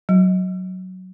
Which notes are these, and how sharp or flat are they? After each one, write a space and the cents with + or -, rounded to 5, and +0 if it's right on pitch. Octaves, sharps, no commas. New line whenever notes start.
F#3 +5